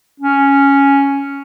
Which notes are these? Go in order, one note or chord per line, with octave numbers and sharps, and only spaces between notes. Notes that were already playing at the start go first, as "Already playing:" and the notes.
C#4